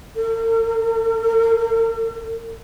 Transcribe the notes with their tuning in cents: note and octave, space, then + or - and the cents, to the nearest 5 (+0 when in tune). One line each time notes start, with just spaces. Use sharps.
A#4 -45